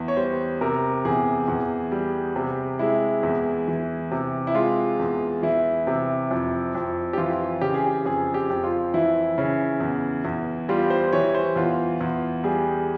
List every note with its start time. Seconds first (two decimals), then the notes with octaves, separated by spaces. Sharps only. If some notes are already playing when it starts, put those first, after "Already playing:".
Already playing: E2
0.08 C#5
0.17 G3 C5
0.61 C3 A#4
1.05 E2 G#4
1.48 E2
1.92 G3
2.36 C3
2.79 G#3 E4
3.23 E2
3.68 E3
4.11 C3
4.47 E4
4.54 G#3 F4
4.99 E2
5.43 E3 E4
5.87 C3
6.31 F2
6.75 F2
7.13 G4
7.17 E3 F4
7.61 C#3 G4
7.74 G#4
7.86 G4
8.06 F2 G#4
8.34 G4
8.50 F2
8.64 F4
8.94 E3 E4
9.38 C#3
9.80 E2
10.25 E2
10.69 G3 F4
10.90 C5
11.13 E3 C#5
11.35 C5
11.56 E2 F4
12.01 E2
12.44 G3 G#4